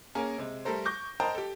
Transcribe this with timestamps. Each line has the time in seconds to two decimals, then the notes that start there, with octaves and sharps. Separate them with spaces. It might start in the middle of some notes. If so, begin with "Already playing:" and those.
0.15 A#3 C#4 G#4 A#4
0.38 C3 G#3
0.65 G3 A3 A4 A#4 C5
0.85 C#6 D6 G6 A#6
1.20 A#4 C5 D#5 G5 A5 A#5
1.35 G4 A4